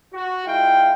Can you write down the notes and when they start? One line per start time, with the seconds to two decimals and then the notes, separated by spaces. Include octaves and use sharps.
0.14 F#4
0.46 G#3 E4 F4 F5 G5